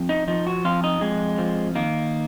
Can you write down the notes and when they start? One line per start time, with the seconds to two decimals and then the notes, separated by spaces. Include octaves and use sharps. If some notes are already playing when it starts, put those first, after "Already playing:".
Already playing: F2
0.09 D#4
0.28 F3 D#4
0.47 F#4
0.65 F2 F4
0.84 D#4
1.01 F2 G#3
1.38 F3
1.75 D#3 A#3